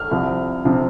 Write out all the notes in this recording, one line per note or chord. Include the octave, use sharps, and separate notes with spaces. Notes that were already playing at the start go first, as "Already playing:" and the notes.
Already playing: F6
C2 C3 F3
C3 F3